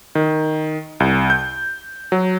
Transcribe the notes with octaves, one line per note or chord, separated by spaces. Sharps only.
D#3
C2
G6
F#3